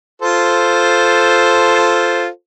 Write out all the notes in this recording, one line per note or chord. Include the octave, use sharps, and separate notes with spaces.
F4 A4 C5